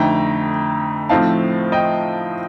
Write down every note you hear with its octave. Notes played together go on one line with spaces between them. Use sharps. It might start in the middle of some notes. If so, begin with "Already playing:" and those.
Already playing: F2 D3 A3 D#4 G5 A#5
A2 F3 A3 C4 D#4 F5 A5
D#5 G5